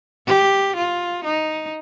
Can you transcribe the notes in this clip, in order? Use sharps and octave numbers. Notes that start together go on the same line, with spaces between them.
G4
F4
D#4